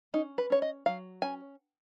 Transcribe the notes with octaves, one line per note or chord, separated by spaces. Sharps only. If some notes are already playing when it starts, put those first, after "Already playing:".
C#4 D#4
B4
C#4 C#5
D#5
F#3 F5
C#4 G#5